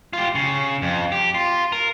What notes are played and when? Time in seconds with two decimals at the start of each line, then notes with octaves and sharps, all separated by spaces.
0.13 F4 G4
0.35 C#3
0.82 F2
1.12 G4
1.35 F4
1.72 A#4